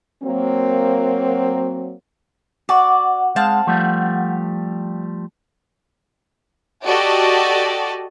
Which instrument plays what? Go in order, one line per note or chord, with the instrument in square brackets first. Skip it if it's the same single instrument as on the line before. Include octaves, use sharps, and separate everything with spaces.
[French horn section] F#3 A#3 C4
[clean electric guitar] F#4 [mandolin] D5 [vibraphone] F#5
[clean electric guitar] G#3 [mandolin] C4 F5 A5
[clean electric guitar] F3 G3 A3
[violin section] F#4 G4 A4 D5 D#5